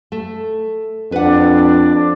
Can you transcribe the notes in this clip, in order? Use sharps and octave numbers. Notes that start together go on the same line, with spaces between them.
A3
F2 D4 B4 F#5